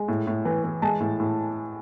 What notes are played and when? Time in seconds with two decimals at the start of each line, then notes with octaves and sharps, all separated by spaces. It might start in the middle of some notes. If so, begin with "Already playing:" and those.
Already playing: G#3
0.08 A2
0.27 A2
0.45 E3
0.64 E3
0.82 G#3 A5
1.00 A2
1.20 A2